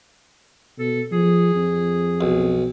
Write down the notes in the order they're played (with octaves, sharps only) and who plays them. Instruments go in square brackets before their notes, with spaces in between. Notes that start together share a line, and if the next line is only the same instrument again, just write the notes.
[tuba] B2 [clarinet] A4
[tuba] F3 [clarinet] G#4
[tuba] F2
[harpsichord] B1